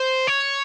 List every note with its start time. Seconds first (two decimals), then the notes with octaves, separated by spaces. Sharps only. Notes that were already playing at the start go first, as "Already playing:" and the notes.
Already playing: C5
0.27 C#5